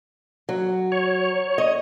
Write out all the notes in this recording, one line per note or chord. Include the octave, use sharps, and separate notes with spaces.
F#3
C#5
D#5